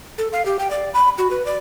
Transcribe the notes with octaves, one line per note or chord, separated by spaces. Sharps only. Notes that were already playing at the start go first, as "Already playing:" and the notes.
A4
F5
G4
G5
D5
B5
F#4
B4
D5